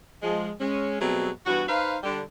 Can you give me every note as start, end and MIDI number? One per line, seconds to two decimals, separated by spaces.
0.23 0.51 53
0.23 0.51 56
0.61 0.99 56
0.61 0.99 61
1.00 1.29 47
1.00 1.29 54
1.00 1.29 55
1.00 1.29 57
1.00 1.29 60
1.00 1.29 68
1.46 1.64 43
1.46 1.64 52
1.46 1.64 59
1.46 1.64 66
1.68 1.97 63
1.68 1.97 71
1.68 1.97 72
1.68 1.97 77
2.04 2.21 50
2.04 2.21 55
2.04 2.21 62